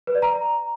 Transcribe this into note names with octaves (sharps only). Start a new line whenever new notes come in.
B4
D5
A#5